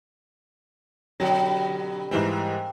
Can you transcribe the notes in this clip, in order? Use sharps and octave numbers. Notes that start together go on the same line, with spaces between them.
G2 B2 D3 F#3
G#2 E3 G3 A#3 C4